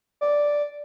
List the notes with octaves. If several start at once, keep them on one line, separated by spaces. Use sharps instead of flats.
D5